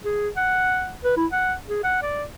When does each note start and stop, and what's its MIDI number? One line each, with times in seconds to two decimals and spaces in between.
0.04 0.29 68
0.37 0.92 78
1.04 1.15 71
1.17 1.26 64
1.32 1.54 78
1.68 1.82 68
1.83 2.02 78
2.02 2.24 74